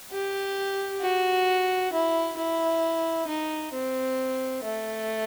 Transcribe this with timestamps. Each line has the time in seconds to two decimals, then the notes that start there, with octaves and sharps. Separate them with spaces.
0.12 G4
1.01 F#4
1.93 E4
2.37 E4
3.28 D#4
3.73 C4
4.64 A3